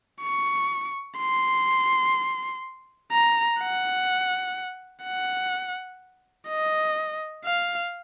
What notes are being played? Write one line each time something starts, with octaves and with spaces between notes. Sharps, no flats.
C#6
C6
A#5
F#5
F#5
D#5
F5